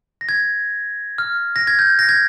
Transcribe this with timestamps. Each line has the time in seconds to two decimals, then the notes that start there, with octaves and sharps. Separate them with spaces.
0.21 A#6
0.29 G#6
1.18 F6
1.56 A#6
1.67 G#6
1.79 G6
1.99 A#6
2.09 G#6